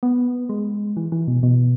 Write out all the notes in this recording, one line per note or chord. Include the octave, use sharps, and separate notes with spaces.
B3
G#3
E3
E3
B2
B2